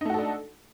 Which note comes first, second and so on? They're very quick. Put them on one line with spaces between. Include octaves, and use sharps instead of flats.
D#4 A3 F#4 A4 D4